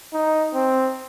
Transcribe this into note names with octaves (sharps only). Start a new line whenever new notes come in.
D#4
C4